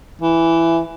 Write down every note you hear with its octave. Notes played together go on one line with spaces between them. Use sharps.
E3